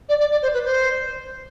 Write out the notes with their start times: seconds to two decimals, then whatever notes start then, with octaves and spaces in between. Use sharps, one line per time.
0.08 D5
0.20 D5
0.31 D5
0.42 C5
0.53 B4
0.64 C5